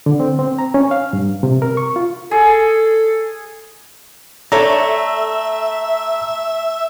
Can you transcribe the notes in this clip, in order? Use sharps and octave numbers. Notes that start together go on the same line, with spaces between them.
D3
C4
C4
A#5
C#4
F5
G2
C3
A#4
C#6
F4
G#4 A4
A3 A4 C#5 D5 E5 A#5